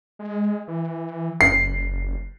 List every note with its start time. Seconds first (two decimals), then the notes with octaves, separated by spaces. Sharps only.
0.19 G#3
0.68 E3
1.41 F#1 C7